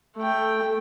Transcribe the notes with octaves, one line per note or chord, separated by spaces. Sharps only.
A3 G5